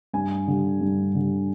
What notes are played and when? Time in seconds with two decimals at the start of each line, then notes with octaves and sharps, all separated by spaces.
0.13 G2 G#5
0.48 D3 G3
0.81 G2
1.15 D3 G3